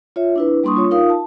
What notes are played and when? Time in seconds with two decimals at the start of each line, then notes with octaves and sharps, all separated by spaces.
0.16 F4 C#5 E5
0.36 D4 E4 B4
0.63 G3 A#3 D4 C6 C#6 D#6
0.76 F4 C#5
0.91 D#4 F4 A#4 F5 D#6
1.10 A5